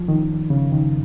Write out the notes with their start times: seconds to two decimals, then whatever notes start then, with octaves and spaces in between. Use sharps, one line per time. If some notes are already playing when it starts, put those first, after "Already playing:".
Already playing: F3
0.08 D#3
0.50 C#3
0.72 D#3